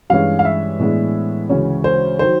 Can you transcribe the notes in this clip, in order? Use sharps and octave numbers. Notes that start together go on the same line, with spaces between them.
G2 E3 G#3 C#4 F5
F5
E5
A2 E3 G#3 B3 D4
D2 C#3 E3 G#3 C#4
C5
D#3 F#3 C5